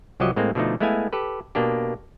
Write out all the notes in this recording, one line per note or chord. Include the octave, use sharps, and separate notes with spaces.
C2 F3 F#3 G4 D#5
A2 G#3 A#3 C4
B2 D3 F3 A3 D#4
G#3 A3 B3 E4 F5 G#5
G4 A4 B4
B2 A#3 D4 G4